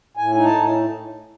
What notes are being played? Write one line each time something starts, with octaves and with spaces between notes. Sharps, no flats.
A2 G#5
D#4 G#5
A5
A2